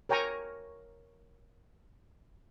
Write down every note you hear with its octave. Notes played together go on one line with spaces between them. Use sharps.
A#4 C#5 G5 G#5 A#5 C#6